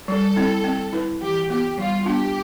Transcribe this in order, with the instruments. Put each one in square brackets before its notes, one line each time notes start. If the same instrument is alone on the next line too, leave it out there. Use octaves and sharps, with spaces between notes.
[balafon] G3 [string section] A4
[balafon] C4 E4
C4
E4 B4
[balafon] E3 [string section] G4
[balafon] B3 F4 [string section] G4
[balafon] G3 [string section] F4
[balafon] B3 D4 F4 [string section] G4